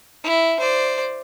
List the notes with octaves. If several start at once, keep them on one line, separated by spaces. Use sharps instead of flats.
E4
C5 D5